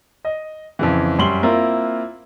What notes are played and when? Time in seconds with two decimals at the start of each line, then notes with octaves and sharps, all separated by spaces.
0.25 D#5
0.79 F2 C#3 E3
1.18 F#2 G3 C6 F#7 G7
1.43 A#3 C4 E4 F4 A#4